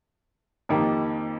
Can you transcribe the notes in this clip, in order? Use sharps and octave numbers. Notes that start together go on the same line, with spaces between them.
F2 D#3 A#3 D#4 G4